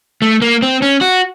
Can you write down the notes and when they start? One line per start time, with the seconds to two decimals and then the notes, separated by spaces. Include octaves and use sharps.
0.22 A3
0.42 A#3
0.62 C4
0.82 C#4
1.01 F#4